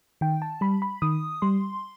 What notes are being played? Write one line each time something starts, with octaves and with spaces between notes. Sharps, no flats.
D#3 G5
A5
G3 B5
B5
D#3 D#6
G3 C6